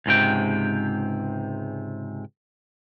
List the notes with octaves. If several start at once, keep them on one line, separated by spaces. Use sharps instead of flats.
C#2 G#2 C3 G5